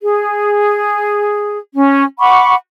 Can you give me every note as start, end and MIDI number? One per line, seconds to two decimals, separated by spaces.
0.02 1.58 68
1.74 2.03 61
2.19 2.54 78
2.19 2.54 83
2.19 2.54 85
2.19 2.54 86